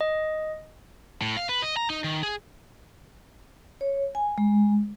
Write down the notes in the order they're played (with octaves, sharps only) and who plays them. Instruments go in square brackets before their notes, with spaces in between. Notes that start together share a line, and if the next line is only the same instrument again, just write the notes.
[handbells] D#5
[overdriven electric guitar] A2
F5
B4
D#5
A#5
D#4
D#3
G#4
[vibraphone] C#5
G#5
G#3